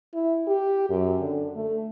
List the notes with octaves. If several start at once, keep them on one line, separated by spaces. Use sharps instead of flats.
E4
G4
F#2
D3
A3